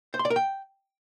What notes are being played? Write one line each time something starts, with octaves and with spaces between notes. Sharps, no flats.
C5
C6
D5
A#4
G5